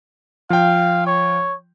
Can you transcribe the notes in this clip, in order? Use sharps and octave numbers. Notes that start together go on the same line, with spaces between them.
F3 F5 G5
C#5